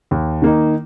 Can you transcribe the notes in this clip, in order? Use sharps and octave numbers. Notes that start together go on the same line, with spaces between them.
D#2
D#3 A#3 D#4